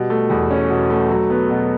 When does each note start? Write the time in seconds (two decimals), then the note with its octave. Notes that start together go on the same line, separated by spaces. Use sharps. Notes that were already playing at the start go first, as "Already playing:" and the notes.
Already playing: B2 G3
0.10 A3
0.30 E2
0.51 C#4
0.70 B2
0.90 A3
1.10 F#3
1.30 B3
1.50 B2